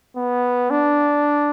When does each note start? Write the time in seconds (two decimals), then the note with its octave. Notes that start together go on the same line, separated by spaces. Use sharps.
0.17 B3
0.71 D4